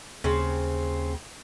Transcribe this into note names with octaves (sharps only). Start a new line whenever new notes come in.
D#2 C#3 C4